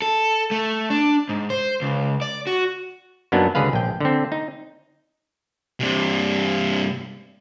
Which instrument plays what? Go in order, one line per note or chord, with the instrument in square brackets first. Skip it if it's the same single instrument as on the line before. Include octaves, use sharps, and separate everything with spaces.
[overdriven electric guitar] A4
A3
D4
G#2
C5
C#2
D5
F#4
[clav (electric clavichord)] F#2 F#3 A#3 B3 D4 D#4
C#2 D3 G#4 B4 F5
A#1 G5
D3 C4
D#4
[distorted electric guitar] G2 C3